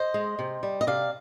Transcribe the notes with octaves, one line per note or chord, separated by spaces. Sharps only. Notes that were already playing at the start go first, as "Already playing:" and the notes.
Already playing: C5 D#5
G#3
C3
G3
D#5
C3 D5 F5